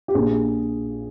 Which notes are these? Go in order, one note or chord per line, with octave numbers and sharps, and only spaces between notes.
G4
A#1 A#2 G#4